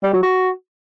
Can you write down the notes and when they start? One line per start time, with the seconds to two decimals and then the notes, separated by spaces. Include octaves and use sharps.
0.03 G3
0.13 F#3
0.23 F#4